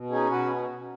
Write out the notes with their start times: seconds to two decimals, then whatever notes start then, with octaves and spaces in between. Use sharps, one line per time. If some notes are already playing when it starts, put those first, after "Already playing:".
Already playing: B2
0.10 C#4 D#4 G#4
0.30 B2 F#4 B4